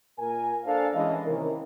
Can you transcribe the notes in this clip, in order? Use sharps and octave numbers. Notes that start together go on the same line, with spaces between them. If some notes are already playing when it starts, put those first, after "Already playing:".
A#2 A#4 G#5
D4 A4 A#4 C5 F5
E3 G#3 C#4 D#5
C3 D#3 A#3 C#4 E4 A#4